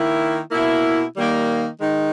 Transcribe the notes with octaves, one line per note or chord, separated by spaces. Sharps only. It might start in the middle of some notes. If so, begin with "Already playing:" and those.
Already playing: D#3 A#3 E4
B2 A#3 E4
D#3 G3 A#3 D#4
D#3 G#3 D#4